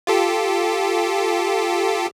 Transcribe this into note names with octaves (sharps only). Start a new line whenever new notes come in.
F4 G4 A4